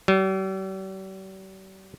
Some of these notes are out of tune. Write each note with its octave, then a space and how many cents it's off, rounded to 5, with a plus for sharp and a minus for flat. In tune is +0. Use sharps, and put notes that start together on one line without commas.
G3 -45